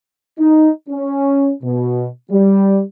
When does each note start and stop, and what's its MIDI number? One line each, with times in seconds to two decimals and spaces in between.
0.38 0.69 63
0.89 1.51 61
1.63 2.06 47
2.31 2.81 55